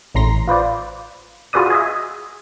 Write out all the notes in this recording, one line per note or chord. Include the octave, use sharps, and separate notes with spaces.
A1 A2 A#5 C6 A#6
F4 B4 C5 D5
F4 F#4 G#4 B4 D5 D#6
G#4 D#5 E5